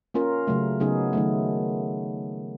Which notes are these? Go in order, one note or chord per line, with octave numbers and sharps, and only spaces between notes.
A#3 C#4 F4 A#4
C#3 F#3 A3
C#3 F#3 B3 D#4 G#4
D#3 F#3 A3